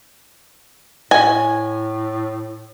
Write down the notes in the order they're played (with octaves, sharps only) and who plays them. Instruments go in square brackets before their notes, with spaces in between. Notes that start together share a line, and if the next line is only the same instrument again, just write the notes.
[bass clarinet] A2 [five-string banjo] G#5